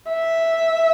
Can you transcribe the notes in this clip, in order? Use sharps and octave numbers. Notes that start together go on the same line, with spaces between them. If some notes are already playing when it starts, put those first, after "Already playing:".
E5